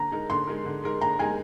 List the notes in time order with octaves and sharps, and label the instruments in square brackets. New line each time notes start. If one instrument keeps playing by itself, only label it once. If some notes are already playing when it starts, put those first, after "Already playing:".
Already playing: [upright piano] D3 [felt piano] A#5
[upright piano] G#3 D#4 A#4
[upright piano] D3 [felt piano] C6
[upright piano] G#3 D#4 A#4
D3
G#3 D#4 A#4
[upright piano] D3 [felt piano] A#5
[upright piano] G#3 D#4 A#4 [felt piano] G#5